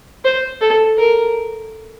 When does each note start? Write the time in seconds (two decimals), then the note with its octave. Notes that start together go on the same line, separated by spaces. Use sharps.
0.25 C5
0.61 A4
0.97 A#4